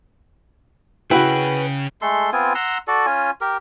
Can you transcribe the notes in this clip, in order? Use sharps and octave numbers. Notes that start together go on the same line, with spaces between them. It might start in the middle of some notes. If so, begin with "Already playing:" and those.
C#3 E4 F#4 G#4 B4 G5 B5
G#3 A3 A4 C6
B3 C4 F4 G#5
F#5 A#5 C6 E6
F#4 A4 D5
C#4 F4 G#5
G4 A#4